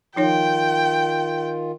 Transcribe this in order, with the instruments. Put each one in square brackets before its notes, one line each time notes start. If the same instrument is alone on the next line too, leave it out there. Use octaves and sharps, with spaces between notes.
[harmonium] D#3 F4 [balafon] F3 D#4 C#5 [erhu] G5